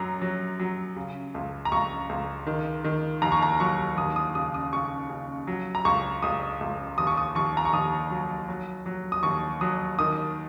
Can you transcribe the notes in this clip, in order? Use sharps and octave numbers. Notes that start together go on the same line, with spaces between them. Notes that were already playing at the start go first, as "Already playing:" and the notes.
Already playing: F#2 F#3 A#5
F#3
F#3
C#3
C#2
A#5
C#2 C#6
C#2
D#3
D#3
D#2 A#5
C#6
A#5
F#3 C#6
D#2 D#6
D#6
C#3 D#6
D#6
C#3 C#6
C#3
F#3
A#5
C#2 C#6
C#2 D#6
C#2
D#2 D#6
C#6
D#6
D#2 C#6
A#5
C#6
D#2 D#6
F#3
F#3
F#3
D#6
D#2 C#6
F#3 D#6
D#3 D#6